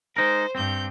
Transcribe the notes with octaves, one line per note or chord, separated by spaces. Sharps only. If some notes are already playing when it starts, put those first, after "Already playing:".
G#3 D#4 A#4 C5
G2 C4 G6